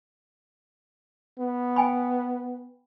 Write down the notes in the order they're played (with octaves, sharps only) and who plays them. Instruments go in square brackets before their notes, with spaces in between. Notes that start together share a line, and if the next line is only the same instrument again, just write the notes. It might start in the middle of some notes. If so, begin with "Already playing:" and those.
[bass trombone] B3
[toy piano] G5 G#5 B5